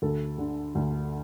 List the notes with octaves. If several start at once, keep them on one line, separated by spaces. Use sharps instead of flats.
D2 A4
D3
D2